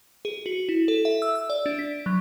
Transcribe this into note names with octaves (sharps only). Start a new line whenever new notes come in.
G#4
F#4
E4
A4
E5
E6
E6
D5
D4
B6
F#3